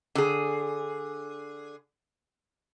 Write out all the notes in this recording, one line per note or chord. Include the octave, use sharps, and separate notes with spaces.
D3 G#4